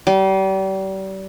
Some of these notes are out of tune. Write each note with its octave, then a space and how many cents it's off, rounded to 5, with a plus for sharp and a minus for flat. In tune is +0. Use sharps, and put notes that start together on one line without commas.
G3 -35